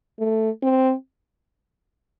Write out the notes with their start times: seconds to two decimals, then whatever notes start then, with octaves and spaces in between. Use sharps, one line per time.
0.19 A3
0.63 C4